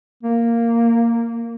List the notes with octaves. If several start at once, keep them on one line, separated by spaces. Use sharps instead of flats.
A#3